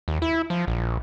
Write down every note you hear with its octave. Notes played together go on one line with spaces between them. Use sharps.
D#2
E4
F3
A#1